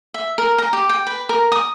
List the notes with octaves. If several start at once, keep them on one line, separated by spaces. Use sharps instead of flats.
E5
A#4
A#5
G4
G5
B4
A#4
D#6